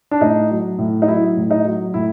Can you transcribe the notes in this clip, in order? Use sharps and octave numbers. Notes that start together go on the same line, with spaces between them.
D4
A2 D#4
F#3
A2
D#4
F#3 E4
A2
D#4
F#3
A2 E4